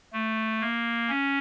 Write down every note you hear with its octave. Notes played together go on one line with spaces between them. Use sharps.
A3
A#3
C#4